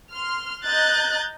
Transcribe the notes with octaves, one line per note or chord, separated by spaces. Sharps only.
C6 F6
D#5 A#5 F#6 G6 A6